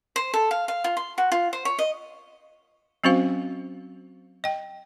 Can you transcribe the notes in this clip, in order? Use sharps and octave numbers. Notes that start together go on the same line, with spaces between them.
C5
A4
F5
F5
F4
C6
F#4
F4
C5
C#5
D#5
F#3 C4 C#4 F#4 C5 F5
D#5 G5